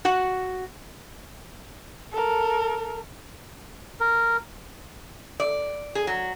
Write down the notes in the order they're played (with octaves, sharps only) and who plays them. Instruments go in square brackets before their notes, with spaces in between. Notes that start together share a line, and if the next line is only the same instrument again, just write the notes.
[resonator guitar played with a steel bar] F#4 F#5
[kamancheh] A4 A#4
[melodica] A#4
[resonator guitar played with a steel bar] D5
G#4
F#3